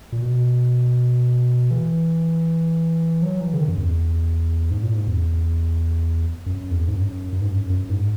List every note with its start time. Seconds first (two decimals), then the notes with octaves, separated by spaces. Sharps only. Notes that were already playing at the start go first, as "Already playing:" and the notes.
0.12 A#2
0.22 B2
1.71 E3
3.22 F#3
3.40 E3
3.54 C#3
3.59 D#3
3.68 F#2
3.78 E2
4.71 G#2
4.83 A#2
4.94 G#2
5.08 E2
6.46 F#2
6.71 E2
6.88 G#2
6.96 F#2
7.33 F#2
7.42 G#2
7.51 F#2
7.70 F#2
7.89 G#2